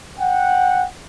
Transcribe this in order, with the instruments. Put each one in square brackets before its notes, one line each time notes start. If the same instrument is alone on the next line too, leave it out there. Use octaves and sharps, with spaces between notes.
[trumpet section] F#5 G5